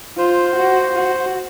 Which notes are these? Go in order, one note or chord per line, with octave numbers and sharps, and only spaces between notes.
F4 C5
F#4
F#4